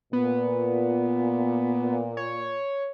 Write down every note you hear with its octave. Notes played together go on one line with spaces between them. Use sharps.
A#2 B3
C#5